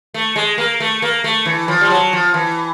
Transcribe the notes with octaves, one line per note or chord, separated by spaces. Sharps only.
A3
G#3
A#3
A3
A#3
A3
E3
F3
G3
F#3
F3
E3